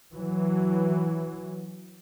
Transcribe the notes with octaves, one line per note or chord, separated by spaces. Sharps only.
E3 F#3